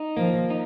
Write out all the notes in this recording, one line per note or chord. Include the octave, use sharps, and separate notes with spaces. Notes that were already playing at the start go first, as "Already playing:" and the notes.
Already playing: D#4
F3 A#3
D#4